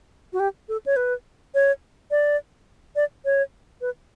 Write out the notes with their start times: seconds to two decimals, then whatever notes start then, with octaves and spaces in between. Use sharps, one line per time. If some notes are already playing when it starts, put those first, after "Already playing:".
0.33 F#4
0.40 G4
0.69 A4
0.86 C#5
0.96 B4
1.54 C#5
2.11 D5
2.96 D5
3.25 C#5
3.81 B4